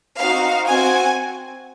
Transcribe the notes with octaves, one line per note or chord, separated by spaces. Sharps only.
C4 D#4 F#4 F5
C4 F#4 G#5